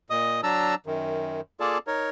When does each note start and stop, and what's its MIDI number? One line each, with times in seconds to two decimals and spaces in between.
0.10 0.41 46
0.10 0.41 75
0.10 0.41 87
0.43 0.75 54
0.43 0.75 62
0.43 0.75 81
0.43 0.75 82
0.43 0.75 88
0.86 1.41 42
0.86 1.41 51
1.60 1.78 58
1.60 1.78 65
1.60 1.78 68
1.60 1.78 69
1.60 1.78 74
1.60 1.78 81
1.87 2.10 63
1.87 2.10 70
1.87 2.10 73